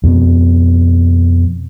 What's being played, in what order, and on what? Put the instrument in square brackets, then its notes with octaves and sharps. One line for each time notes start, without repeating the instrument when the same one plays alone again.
[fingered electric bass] F2 B2